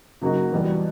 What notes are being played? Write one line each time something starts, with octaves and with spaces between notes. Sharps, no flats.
C#3 F#3 A#3 D#4 F#4
E2 B2 G3